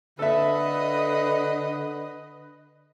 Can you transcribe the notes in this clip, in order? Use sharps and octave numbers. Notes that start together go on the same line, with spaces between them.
D3 A4 B4 D#5 E5